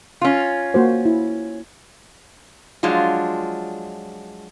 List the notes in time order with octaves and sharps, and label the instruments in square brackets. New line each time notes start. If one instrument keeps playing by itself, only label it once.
[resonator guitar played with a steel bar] C#4 F4
[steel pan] A#3 F#4 C5
E4
[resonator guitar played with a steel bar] F3 F#3 G#3 D4 F4